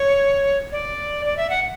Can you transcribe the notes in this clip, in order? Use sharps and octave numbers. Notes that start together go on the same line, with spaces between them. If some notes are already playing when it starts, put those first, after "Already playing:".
Already playing: C#5
D5
D5
E5
F#5